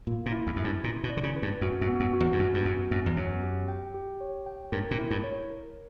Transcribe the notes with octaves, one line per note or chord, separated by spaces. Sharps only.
A#2 A#3
A#2
E4
E2
F#2 E4
G2
A#2 E4
B2
D5
D3
C#3
B4
G2
F#2 F#4
F#2
B3
F#2
F#4
E2
G2
F#2 F#4
G2
F#2 B3
F#2 B3
E2
F#2 C#5
G4
G5
G4
C#5
G5
G2 A#4
A#2
E4
G2
C#5
A#4